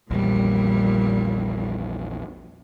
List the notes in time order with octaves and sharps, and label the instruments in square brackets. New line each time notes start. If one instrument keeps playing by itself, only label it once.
[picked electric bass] A#1 E2 [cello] A#2 G3